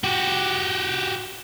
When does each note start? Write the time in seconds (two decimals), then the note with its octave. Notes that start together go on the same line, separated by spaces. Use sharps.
0.04 F#4 G4